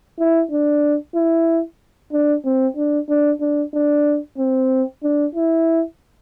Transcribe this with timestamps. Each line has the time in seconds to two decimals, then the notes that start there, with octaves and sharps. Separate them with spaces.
0.19 E4
0.51 D4
1.15 E4
2.13 D4
2.45 C4
2.77 D4
3.09 D4
3.41 D4
3.74 D4
4.38 C4
5.03 D4
5.35 E4